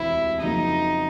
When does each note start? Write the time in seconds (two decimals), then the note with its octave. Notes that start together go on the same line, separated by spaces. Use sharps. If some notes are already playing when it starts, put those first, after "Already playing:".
Already playing: E1 D2 C3 E4
0.42 F2 C#3 F#3 A#3 D#4